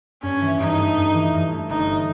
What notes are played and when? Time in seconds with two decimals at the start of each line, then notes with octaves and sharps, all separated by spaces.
0.23 G2 C#4
0.41 E3
0.59 G2 D#4
0.78 A3
0.97 G2
1.15 E3
1.33 G2
1.51 A3
1.70 G1 D#4